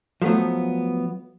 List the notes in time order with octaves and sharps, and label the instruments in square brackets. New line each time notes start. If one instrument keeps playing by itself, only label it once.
[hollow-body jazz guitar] F3 F#3 A3 B3